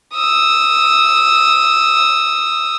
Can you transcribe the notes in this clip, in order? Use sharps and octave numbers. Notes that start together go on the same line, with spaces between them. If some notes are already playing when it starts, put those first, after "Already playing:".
D#6 E6